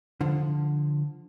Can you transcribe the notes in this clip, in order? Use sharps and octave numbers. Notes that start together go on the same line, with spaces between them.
D3 F3